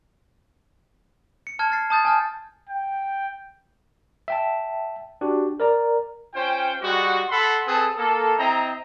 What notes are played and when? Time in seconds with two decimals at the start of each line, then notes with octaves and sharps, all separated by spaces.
1.47 C#7
1.59 A5 F6 G#6
1.70 F6 A6 C7
1.90 A5 D#6 G6 A6
2.05 G#5 A5 F6
2.69 G5
4.28 E5 G5 A5
5.21 D4 F#4 G4
5.60 A#4 D5 A#5
6.34 C#4 F4 C5 G5
6.81 G3 G#3 F#4
7.29 A4 F#5 B5 C6
7.66 C4 G#4 A4 B4 A5
7.96 A#3 A4
8.37 C4 E4 D#5 A#5